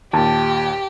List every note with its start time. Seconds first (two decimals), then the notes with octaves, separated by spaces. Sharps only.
0.13 D#2 A#2 G4 A5